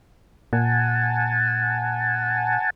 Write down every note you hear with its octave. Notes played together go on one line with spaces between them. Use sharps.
A#2 F#5 G#5 A5